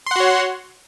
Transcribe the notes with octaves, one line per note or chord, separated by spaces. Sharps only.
F#4 C#5 F#5 C6